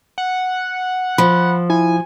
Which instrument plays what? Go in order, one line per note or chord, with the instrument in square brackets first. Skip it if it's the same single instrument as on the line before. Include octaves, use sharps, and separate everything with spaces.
[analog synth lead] F#5
[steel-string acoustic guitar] F3 [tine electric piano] B5
[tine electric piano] E4 [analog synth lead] G#5